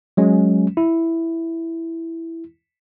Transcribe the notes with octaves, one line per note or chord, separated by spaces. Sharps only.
F#3 G#3 C#4
E4